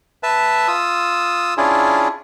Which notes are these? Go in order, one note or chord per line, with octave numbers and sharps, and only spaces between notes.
B4 E5 A5
F4 D#6 E6
C#4 D4 E4 F4 G#4